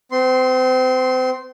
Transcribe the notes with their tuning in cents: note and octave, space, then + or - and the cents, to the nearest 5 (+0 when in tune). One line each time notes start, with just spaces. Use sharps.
C4 -30 C6 +0